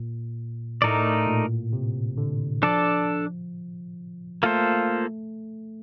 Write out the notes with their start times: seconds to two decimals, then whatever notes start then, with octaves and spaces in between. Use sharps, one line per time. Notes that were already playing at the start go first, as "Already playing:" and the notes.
Already playing: A#2
0.82 A2 A3 D#4 A#4 D5
1.27 A#2
1.73 C3
2.17 D3
2.62 F3 D4 A4 D5
4.43 A3 A#3 F4 A4 C5